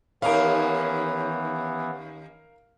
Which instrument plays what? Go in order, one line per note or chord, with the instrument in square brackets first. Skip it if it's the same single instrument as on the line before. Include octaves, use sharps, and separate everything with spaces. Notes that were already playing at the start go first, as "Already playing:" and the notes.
[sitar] D#2 C#4 [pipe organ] E3 B3 [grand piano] A#4 F5